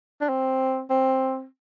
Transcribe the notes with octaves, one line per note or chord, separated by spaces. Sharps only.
D4
C4
C4